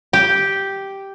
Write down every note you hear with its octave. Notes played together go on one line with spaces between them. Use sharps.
G4